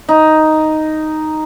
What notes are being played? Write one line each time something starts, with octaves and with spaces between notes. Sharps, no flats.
D#4